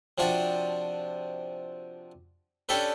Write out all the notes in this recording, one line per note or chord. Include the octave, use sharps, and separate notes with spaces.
C3 F3 D4 F#4
C#4 D4 G4 A4 B4